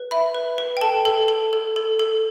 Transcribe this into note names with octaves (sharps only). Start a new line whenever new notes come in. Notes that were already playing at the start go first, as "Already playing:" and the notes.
Already playing: B4
E5 B5
B4
B4
G5
A4 A5
A4
A4
A4
A4
A4